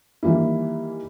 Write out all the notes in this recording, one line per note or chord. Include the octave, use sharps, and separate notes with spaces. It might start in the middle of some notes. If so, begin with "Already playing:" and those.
D#3 E3 G3 A#3 E4